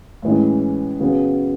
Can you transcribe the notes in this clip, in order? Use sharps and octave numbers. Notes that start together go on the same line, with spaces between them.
A2 E3 G#3 C#4
C#3 F#3 B3